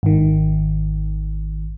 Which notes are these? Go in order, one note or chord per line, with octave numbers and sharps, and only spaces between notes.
G#1 D#3